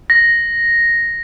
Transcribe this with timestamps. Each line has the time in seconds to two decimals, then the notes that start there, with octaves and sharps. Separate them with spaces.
0.10 A#6